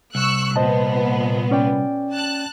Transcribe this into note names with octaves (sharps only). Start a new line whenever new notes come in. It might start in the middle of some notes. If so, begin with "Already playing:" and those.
C2 C#6 E6 F#6
A#2 B3 C5 D#5 A5
C#4 D5 G5
A5 F#6